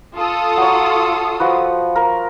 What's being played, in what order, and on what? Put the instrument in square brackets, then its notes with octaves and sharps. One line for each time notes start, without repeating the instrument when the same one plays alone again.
[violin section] F4 A4 D#6
[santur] F#3 C#5
F3 F#4 B4
A#4